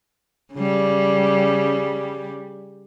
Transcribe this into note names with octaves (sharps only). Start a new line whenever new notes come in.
C#3 G3